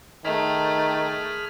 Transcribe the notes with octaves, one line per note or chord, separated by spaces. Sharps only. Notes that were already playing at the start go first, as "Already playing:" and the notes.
D#3 A3 G#4 B5 F6